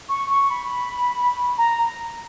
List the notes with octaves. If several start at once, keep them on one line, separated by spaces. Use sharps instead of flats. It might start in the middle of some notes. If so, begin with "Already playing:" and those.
C#6
C#6
B5
A#5